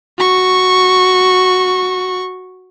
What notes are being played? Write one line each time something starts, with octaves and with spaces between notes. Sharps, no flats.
F#4 C#6